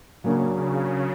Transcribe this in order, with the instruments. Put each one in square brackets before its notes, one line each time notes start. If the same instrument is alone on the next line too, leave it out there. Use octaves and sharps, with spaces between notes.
[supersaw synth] C#3 [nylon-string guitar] F#3 A#3 D4
[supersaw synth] C#3